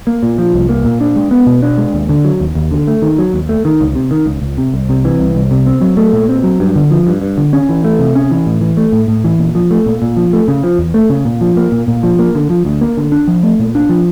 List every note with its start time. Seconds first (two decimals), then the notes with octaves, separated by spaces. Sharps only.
0.07 A#3
0.23 A#2
0.38 F3
0.54 C2
0.69 A#3
0.85 A#2
1.01 D4
1.16 G#3
1.31 B3
1.46 B2
1.62 D4
1.78 G#3
1.93 D#2
2.09 D3
2.24 F#3
2.40 D#2
2.55 D#2
2.71 D3
2.87 A3
3.02 D#3
3.18 F#3
3.34 D#2
3.49 A3
3.65 D#3
3.81 C#2
3.95 C3
4.11 D#3
4.26 C#2
4.42 C#2
4.58 C3
4.74 C2
4.89 C3
5.05 E3
5.19 C2
5.35 C2
5.51 C3
5.66 C4
5.81 F#3
5.97 A3
6.13 A#2
6.29 C4
6.44 F#3
6.60 G2
6.76 D3
6.91 F3
7.07 G2
7.22 G2
7.38 D3
7.53 C#4
7.69 E3
7.84 A3
7.99 C3
8.15 C#4
8.31 E3
8.46 A2
8.61 E3
8.77 A3
8.92 A2
9.08 A2
9.24 E3
9.39 A#2
9.55 F3
9.71 A3
9.86 A#2
10.02 A#2
10.17 F3
10.33 A3
10.48 C#3
10.64 F3
10.79 E2
10.94 A3
11.10 C#3
11.25 A#2
11.41 F3
11.57 A#3
11.72 A#2
11.88 A#2
12.03 F3
12.19 A#3
12.35 D3
12.50 F3
12.65 D2
12.81 A#3
12.97 D3
13.12 D4
13.28 F3
13.43 A3
13.59 A#2
13.75 D4
13.89 F3